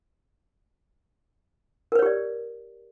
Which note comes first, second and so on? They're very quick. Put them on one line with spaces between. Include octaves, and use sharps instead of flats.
A#4 B4 C#5 G4 D5